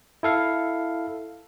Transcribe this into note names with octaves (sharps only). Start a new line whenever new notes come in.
E4 A4 F5